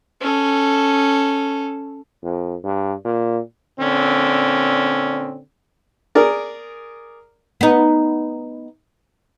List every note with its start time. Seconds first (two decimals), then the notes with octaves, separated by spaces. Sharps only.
0.21 C#4 A4
2.23 F2
2.64 G2
3.05 A#2
3.79 A#2 D3 C4 C#4
6.15 G#4 A#4 D5
7.61 B3 D#4